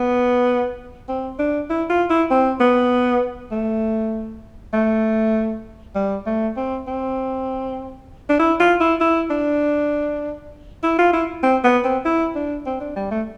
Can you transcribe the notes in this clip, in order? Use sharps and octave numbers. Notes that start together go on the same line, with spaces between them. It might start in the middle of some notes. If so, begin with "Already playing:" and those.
Already playing: B3
C4
D4
E4
F4
E4
C4
B3
A3
A3
G3
A3
C4
C4
D4
E4
F4
E4
E4
D4
E4
F4
E4
C4
B3
C4
E4
D4
C4
D4
G3
A3